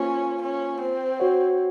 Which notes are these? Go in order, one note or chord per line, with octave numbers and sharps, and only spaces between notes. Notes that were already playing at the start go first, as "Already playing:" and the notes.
Already playing: A#3 C#4 F4 C5
C#4
C4
F#4 C#5 F#5